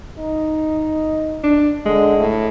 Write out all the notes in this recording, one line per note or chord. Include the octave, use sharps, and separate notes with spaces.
D#4
D4
D3 G#3
A2